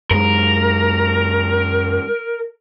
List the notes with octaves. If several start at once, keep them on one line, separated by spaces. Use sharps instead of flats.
F#2 G#3 A#4